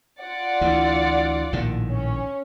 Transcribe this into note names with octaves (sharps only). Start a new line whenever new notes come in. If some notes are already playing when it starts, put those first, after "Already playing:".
F4 D5 F#5
D2 E3
A#1 A2 D#3
C#4